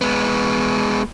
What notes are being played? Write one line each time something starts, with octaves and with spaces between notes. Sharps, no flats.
G#3 B3